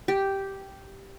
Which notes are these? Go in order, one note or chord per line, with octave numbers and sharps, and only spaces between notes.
G4